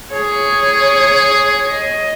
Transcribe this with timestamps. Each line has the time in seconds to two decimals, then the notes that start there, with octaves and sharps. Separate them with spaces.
0.12 G#4 C#5
1.69 D#5